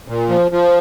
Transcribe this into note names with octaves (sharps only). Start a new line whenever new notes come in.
A#2
F3
F3